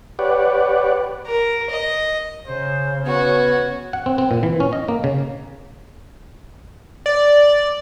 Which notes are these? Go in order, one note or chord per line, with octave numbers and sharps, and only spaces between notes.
G4 B4 C#5 D5 F#5
A#4
D#5
C#3 C5
B3 C#4 F#4 G#6
F#5
C4
C4
A#2
E3
C#4
D#5
A#3
C#3
D5